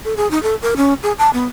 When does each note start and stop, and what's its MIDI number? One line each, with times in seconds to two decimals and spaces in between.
0.05 0.14 69
0.17 0.30 68
0.31 0.41 63
0.43 0.55 69
0.62 0.74 70
0.77 0.94 61
1.03 1.12 68
1.18 1.30 81
1.33 1.46 59